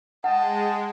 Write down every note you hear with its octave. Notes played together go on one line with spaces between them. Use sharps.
G#3 D#5 F#5 G5 A5